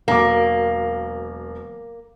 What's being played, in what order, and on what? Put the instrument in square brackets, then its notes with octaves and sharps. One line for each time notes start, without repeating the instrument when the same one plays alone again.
[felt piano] E1 F#3 D6 [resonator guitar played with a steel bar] A#3